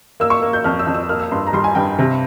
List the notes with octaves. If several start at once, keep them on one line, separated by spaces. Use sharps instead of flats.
A#3 E6
C#6
A#3
G6
F2 F6
E6
F2
E6
A#3 F6
E6
G2 C6
A#5
G3 C6
G#5
G2 G5
C3